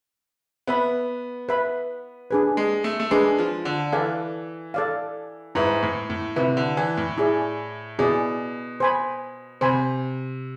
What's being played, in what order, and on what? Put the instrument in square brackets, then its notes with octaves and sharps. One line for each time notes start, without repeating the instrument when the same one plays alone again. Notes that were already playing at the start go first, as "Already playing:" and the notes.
[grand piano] B3 [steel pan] B4 E5 B5
[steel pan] B4 E5 B5
D4 G#4 B4
[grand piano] G#3
A3
A3
[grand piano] G#3 [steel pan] D4 G#4 B4
[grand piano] F3
D3
[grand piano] E3 [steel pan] A4 D5 F5
[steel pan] A4 D5 F5
[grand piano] G#2 [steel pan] E4 B4 E5
[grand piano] A2
A2
[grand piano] C3 [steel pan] E4 B4 E5
[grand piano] D3
E3
A2
[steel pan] E4 G#4 D5
[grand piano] B2 [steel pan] E4 G#4 D5
[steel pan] C5 G#5 B5
[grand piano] C3 [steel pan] C5 G#5 B5